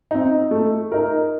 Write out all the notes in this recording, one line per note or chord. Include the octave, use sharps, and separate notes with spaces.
C4 D#4
A3
D#4 A#4